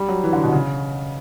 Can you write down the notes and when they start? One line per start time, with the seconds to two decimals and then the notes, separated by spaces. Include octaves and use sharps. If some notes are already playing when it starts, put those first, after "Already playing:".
Already playing: G3
0.08 F#3
0.24 E3
0.33 D3
0.44 B2
0.52 C#3